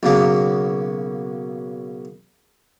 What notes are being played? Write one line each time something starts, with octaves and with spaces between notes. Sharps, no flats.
B1 C#3 A#3